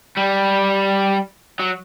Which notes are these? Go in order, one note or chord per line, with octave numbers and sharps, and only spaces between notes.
G3
F#3